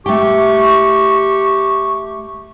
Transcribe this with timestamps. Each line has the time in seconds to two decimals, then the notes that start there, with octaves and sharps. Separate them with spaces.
0.06 A3 G4 G5 C#6